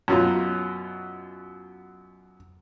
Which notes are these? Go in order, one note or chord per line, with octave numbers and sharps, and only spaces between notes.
F#2 B2 F4